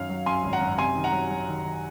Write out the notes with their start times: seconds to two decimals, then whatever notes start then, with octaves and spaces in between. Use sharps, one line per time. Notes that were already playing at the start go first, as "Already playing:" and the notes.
Already playing: F#2 D#3 C#5 F5
0.09 F#3
0.26 F#2 G#5 C6
0.43 G#1
0.53 F#5 A#5
0.61 F#2
0.78 C3 G#5 C6
0.95 D#3
1.04 F#5 A#5
1.12 F#3
1.30 F#3
1.47 D#3
1.64 D#3